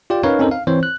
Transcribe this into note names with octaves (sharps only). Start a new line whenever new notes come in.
F4 G4 D5 G5
C#4 D#4 A#4 B4 C#5 F5
C4 C#4 D#4 A4 A#4 C5
F5
E3 C4 C5 C#5
F#6